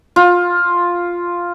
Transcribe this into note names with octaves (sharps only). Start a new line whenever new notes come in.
F4